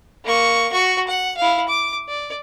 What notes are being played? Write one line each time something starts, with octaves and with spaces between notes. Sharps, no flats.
A#3 C#6
F#4 C#6
F#5
E4 F5
D6
D5